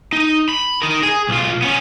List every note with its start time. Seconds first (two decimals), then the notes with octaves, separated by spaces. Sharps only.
0.13 D#4
0.49 B5
0.82 D#4 A#4
1.03 G#4
1.29 B1 F4
1.62 B3 C#4